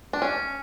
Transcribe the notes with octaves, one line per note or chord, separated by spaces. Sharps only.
D4
C#4